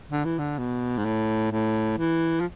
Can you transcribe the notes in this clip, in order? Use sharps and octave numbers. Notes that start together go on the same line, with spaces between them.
D3
E3
D3
B2
G#2
A2
A2
E3
F3